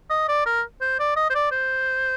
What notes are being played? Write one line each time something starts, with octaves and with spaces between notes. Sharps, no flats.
D#5
D5
A#4
C5
D5
D#5
C5
D5
C5